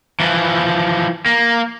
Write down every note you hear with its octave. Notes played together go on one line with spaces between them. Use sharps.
E3 F3
A#3